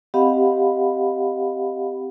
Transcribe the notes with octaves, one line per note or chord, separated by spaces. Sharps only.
C4 G4 D#5 F5 F#5 B5